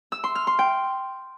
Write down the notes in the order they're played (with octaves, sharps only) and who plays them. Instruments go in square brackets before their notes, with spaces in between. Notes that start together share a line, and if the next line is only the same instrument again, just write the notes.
[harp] E6
C6
F6
C6
G5